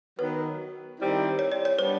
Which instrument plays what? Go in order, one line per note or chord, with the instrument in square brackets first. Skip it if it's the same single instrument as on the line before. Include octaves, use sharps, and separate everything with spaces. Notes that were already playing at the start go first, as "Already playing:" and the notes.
[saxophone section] D#3 F#3 B3 [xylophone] B4
[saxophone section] D#3 G3 C4 E4
[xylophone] C#5
D5
C#5
[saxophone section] G3 B3 D4 [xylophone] C5